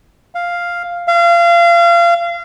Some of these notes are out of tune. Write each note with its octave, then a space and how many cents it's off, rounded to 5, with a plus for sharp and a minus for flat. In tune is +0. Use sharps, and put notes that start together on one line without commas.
F5 +0
F5 -30